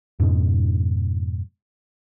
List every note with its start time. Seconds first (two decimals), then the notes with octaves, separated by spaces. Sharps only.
0.20 F2 G#2 B2